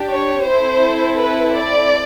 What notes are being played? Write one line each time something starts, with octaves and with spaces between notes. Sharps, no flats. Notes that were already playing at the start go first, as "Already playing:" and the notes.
Already playing: D4 G4
C#5
C4 E4 A4 C5
B4
D5